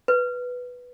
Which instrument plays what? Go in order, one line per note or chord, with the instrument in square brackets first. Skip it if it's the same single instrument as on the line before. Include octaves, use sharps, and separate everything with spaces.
[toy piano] B4